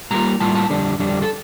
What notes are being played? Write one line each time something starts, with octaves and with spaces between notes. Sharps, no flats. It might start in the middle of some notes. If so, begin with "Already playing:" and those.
A2 G3 A#3 F4 A#5
A2 G3 A#3 F4 A5
A5
F2 D3 G3 D4
F2 D3 G3 D4
A4